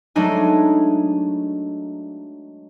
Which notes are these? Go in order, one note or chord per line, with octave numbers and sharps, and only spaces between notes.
F#3 G#3 A3 D4 D#4 G#5